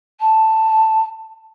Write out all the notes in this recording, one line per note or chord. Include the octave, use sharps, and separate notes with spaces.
A5